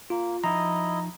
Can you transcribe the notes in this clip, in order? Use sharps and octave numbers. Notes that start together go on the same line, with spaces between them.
A#3 F4
F3 D#4 E4 D#5 A#5